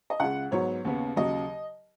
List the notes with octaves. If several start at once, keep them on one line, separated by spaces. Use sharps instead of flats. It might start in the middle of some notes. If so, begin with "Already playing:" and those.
D#5
C#2 C#3 G#3 F#5
G#2 F#3 B3 C#5
D#2 C#3 B3
D#2 C#3 F#3 D#5